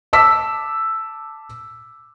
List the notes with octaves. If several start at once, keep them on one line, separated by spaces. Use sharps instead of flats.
A5 D6 E6 B6